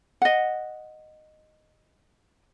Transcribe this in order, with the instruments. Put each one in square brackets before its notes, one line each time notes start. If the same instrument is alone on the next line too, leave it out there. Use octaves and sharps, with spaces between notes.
[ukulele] D#5 F#5